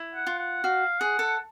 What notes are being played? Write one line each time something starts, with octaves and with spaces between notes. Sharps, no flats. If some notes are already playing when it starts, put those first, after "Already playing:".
Already playing: E4
F#5
F4
F#5
F#4 F5
G#4 F#5
A4